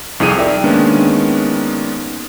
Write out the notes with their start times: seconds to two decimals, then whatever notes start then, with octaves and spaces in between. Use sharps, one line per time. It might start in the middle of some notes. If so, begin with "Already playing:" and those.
0.20 C2 F2 D#4 G#4 D#7
0.39 A#4 D5 E5 G5
0.64 D#3 G#3 A#3 B3 C#4 D4